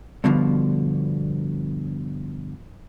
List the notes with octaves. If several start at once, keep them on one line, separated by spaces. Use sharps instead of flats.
G2 B2 D3 F3